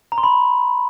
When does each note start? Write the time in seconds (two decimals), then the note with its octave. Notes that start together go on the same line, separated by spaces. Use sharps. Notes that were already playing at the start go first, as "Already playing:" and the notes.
0.12 A#5
0.18 C6
0.23 B5